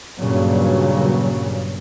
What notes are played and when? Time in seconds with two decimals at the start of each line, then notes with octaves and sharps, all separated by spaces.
0.19 G2 A#2 C#3 F#3